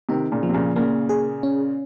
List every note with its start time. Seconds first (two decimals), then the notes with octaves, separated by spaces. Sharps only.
0.09 C3 D#3 D#4
0.32 A#2 C#3
0.43 F3
0.49 C3
0.54 A#2 C#3
0.76 A#2 C#3 A#3
1.09 G#4
1.43 C#4